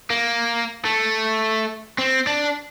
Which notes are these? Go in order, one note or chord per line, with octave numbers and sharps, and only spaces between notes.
A#3
A3
C4
D4